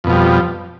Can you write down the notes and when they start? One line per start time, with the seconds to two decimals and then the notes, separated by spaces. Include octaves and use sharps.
0.04 F2
0.07 B2
0.10 F3
0.12 G3